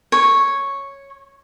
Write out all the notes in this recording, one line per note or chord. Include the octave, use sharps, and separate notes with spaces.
C#5